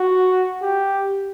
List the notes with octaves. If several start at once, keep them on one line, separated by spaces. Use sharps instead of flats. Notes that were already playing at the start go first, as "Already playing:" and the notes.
Already playing: F#4
G4